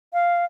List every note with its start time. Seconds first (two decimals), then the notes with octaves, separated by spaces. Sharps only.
0.13 F5